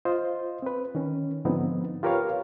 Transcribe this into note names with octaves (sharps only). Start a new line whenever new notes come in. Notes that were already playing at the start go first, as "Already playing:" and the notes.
F4 C5 D#5
C4 B4
D#3 C#4
G#2 D3 F3 B3 C4 D#4
F4 G4 A#4 B4 C#5 F5